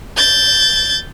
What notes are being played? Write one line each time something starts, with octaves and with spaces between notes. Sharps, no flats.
G6 A6